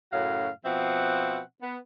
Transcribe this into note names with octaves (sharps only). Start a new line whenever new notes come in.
F#2 A2 C#3 F#4 F5
B2 F3 C4 E5 F#5
B3